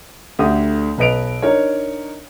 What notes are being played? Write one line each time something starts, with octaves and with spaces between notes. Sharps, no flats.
D2 D3 G4 D#6
B1 B4 D#5 D7 F7
D4 D#4 A#4 C#5